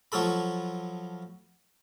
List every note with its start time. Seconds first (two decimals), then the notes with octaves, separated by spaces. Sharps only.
0.12 F3 F#3 F4 A4 B5